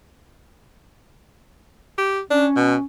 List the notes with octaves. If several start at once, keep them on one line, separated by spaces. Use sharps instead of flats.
G4
C#4 D4
B2